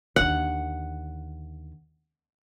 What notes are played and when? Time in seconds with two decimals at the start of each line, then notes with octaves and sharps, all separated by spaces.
0.16 D#2 D3 F#5